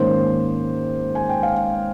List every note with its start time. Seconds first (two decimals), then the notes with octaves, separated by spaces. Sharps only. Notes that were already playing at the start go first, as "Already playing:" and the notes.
Already playing: G#2 D#3 A#3 C#4 C5
1.15 G#5
1.29 G5
1.43 F5